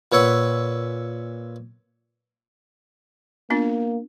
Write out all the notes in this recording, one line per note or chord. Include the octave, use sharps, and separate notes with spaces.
A#2 B4 C#5 E5 F#5
A#3 B3 D4 F4